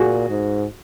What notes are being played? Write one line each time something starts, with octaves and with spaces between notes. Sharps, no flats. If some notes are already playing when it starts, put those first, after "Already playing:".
Already playing: A#2 F#4 G#4
G#2